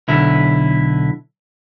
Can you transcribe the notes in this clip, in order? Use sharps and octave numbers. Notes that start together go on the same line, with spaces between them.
B1 D3 E4